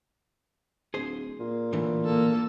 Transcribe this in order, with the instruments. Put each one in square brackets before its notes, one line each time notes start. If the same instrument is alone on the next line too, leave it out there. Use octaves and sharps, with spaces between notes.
[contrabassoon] D1 [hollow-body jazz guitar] G#4 C5
[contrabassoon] A#2
[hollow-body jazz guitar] A2 D3 E3
[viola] A#3 A4